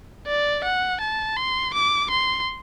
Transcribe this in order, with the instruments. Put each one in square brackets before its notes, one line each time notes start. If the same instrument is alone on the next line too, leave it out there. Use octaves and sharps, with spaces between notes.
[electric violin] D5
F#5
A5
C6
D6
C6